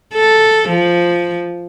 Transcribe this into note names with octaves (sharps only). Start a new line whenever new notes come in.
A4
F3